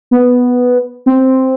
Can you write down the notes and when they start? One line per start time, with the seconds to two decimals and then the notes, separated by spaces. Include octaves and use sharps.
0.11 B3
1.06 C4